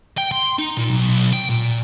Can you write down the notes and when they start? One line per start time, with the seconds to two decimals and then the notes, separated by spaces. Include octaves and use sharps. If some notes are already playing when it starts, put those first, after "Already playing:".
0.18 G5
0.31 C6
0.59 D#4
0.77 A#2
0.90 B1
1.33 G5
1.49 A#2